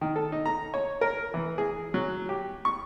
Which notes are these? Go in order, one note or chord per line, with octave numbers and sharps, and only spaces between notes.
D#3
A4
D#4
A#5
C#5
A#4
E3
G#4
F#3
G4
C#6